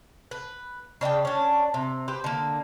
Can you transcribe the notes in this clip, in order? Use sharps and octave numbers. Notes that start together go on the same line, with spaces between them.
B4
C#3 D4 D5 G5
C#4 D4
C3
G4 B4 C5
D3 A#3